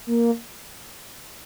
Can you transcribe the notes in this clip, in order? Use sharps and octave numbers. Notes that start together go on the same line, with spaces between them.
A#3